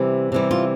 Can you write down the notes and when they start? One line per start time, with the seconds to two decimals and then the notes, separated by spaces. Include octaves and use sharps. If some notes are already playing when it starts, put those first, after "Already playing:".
Already playing: C3 E3 G3
0.32 C3 E3 G3
0.51 F4